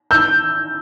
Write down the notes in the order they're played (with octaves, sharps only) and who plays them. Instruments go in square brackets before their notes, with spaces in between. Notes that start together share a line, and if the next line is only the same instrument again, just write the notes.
[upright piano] E6 G6